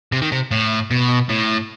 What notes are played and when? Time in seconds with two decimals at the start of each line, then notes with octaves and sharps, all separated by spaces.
0.12 C3
0.22 D#3
0.32 C3
0.51 A2
0.91 B2
1.29 A2